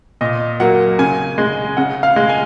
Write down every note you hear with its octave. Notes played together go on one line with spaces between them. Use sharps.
A#2 D#5
F#3 A#3 F#5
C#3 G#5
G#3
C#3 F#5
F5
G#3
G#5